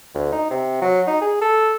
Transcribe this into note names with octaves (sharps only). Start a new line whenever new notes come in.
D2
D#4
C3
F#3
D#4
G#4
A4